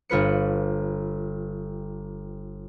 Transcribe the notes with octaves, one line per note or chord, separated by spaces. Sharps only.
G1 F4 B4 C#7